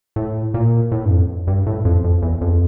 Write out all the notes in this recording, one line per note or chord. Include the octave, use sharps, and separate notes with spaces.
A2
A#2
A2
G2
F2
G2
A2
F2
F2
E2
F2